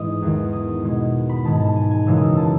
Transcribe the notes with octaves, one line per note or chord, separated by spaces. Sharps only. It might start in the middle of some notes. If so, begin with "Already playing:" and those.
Already playing: G#2 E3 G#3 D#6
E2 D#3 G#3
D#6
B2 G#3
B5
G#2 D#3 G#3 A5
A5
G#5
G#5
F#2 C#3 E3 G#3 E6
D#6 E6
A5